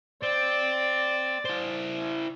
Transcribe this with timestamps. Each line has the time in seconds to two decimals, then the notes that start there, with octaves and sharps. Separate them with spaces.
0.23 C4 D5
1.45 E4 C5